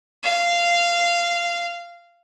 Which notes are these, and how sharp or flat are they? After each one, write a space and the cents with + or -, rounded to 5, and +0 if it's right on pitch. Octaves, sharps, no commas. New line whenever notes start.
F5 -15